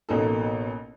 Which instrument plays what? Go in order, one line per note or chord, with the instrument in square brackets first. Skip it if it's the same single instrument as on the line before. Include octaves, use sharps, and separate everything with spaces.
[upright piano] A1 B2 A#3 D#4 A4